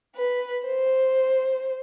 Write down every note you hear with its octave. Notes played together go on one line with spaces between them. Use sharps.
B4
C5